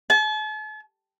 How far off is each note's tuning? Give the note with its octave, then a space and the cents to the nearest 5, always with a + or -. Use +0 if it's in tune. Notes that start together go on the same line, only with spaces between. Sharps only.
A5 -45